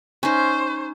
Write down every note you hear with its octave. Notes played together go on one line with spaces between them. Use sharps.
C#4 D#4 C5